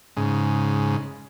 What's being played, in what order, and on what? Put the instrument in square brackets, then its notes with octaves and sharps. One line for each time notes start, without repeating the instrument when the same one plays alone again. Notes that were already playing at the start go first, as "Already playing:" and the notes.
[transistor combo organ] G#2 C#3